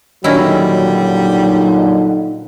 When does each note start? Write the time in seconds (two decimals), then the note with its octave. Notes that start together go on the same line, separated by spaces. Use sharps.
0.24 A#2 D3 D#3 F#3 G3 C#4 E4 F#4
1.15 D#4